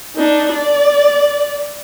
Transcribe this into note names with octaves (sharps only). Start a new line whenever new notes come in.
D4 D#4
D5